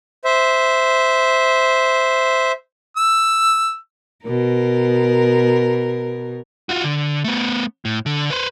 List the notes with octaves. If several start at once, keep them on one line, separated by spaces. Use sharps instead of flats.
C5 E5
E6
B2 A#4
F4 F#4
D3
A3 B3
A2
D3
B4 C5